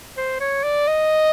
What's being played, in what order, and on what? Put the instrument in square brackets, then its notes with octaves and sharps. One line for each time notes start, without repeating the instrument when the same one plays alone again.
[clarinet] C5
C#5
D5
D#5